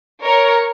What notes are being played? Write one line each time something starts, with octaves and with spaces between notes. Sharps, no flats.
A#4 C#5